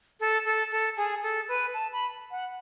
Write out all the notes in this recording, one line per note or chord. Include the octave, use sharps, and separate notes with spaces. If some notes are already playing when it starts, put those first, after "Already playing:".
A4
A4
A4
G#4
A4
B4
A5
B5
F#5